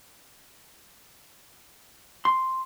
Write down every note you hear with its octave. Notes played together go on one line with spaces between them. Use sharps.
C6